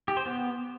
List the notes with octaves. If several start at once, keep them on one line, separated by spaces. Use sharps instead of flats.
G4
C5
B3